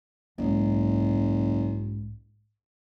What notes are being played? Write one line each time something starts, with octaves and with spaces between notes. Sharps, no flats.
F#1 B1 G#2